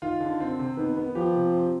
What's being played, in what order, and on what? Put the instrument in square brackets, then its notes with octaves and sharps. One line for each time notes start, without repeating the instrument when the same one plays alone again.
[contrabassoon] D#3 [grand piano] F4
[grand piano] D3
C4
C3
[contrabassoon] D#3 [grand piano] B3
[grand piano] B3
[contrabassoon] F3 [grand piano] G4
[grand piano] C3
C5